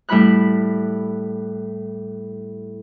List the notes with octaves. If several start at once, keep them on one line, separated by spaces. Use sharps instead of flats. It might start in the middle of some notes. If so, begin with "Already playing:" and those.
A2 G3 E4 B5 F#6